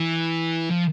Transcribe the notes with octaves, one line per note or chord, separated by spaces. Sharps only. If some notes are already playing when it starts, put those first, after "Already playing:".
Already playing: E3
F3